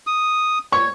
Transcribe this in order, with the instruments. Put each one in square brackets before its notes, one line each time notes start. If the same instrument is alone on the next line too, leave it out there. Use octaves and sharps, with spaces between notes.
[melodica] D#6
[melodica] C#5 [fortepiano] C#6